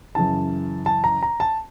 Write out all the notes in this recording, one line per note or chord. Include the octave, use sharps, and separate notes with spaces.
F#2 C#3 E3 A5
A5
A#5
A#5
A5